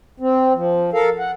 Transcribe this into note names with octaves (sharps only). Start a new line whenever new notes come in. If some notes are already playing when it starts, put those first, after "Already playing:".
C4
F3
A4 A#4 F5
F#5